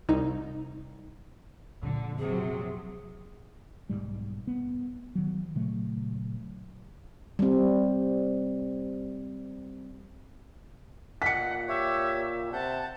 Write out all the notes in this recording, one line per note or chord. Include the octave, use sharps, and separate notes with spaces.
C2 D#4
F2 A#2 D3
C3 F#3 G#4
B1 F2 G#2 G3
B3
D#3 F#3
A#2 C#3 F#3 A3
G3 C4
A#2 D#5 F#5 B6 C#7
G4 C#5 E5
C3 F#5 A5 G6